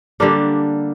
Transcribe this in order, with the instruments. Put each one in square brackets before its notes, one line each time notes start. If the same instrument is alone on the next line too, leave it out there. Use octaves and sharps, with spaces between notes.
[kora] D3 G3 A#3 D4